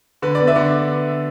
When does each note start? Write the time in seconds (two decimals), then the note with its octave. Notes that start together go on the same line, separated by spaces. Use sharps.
0.22 D3 B4
0.35 B3 D5
0.47 B4 E5
0.56 D3